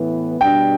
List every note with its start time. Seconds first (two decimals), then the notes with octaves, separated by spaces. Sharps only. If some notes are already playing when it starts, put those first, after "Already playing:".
Already playing: A2 E3 B3
0.41 B2 G3 D4 G5